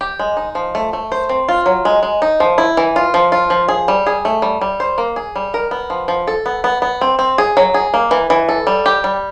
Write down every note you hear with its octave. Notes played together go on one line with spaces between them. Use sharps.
G4
G#3
D#4
F3
A3
A3
C5
C4
F4
F#3
G#3
G#3
D#4
F3
E4
E3
F4
F3
F4
F3
G#4
G3
G#4
A3
G3
G3
C5
A#3
G#4
G3
A#4
B3
F3
F3
A4
B3
B3
B3
C4
C4
G#4
F#3
G#4
A#3
E3
E3
A4
G3
G4
G3